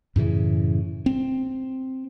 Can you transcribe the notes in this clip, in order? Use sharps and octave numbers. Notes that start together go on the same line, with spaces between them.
F#2 A2 C#3 E3
C4